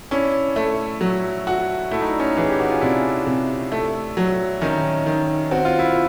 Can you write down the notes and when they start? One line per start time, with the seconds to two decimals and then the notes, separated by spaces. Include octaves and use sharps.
0.11 C#4 D4 E4
0.56 A3
1.01 F#3
1.47 F#4
1.91 A3 E4
2.01 D#4
2.10 D4
2.20 C#4 D#4
2.37 E3 G#4
2.49 G4
2.60 F#4
2.71 F4
2.81 C3 D4 E4
3.26 C3
3.72 A3
4.17 F#3
4.61 D#3 C#4 D#4
5.06 D#3
5.51 C4 F#4
5.65 F4
5.79 E4
5.93 F4